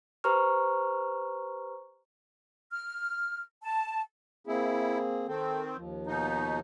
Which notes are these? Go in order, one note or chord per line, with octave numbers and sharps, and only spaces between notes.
G4 B4 C5 A#5 C#6 F6
F6
A5
A#3 C4 E4 G#4
D#3 C4 A4 G5
D#2 F3
B2 D#4